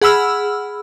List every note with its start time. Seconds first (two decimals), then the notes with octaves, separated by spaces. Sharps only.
0.02 G#4 F#5 B5 E6 F6